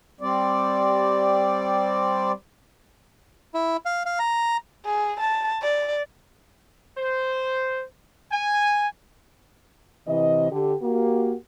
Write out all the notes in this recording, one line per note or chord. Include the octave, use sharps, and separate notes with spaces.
G3 C4 D5
E4
F5
F5
A#5
G#4
A5
D5
C5
G#5
C3 E3 D#5
D3 G4
A#3 F#4 G4